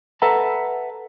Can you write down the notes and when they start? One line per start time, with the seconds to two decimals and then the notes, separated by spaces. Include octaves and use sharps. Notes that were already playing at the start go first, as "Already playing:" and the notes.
0.22 A4 B4 E5 F#5 A5 A#5